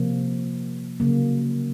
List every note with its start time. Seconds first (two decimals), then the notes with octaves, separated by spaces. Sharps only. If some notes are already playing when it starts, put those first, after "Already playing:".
Already playing: C3 F3 A#3
1.00 C#3 F#3 A#3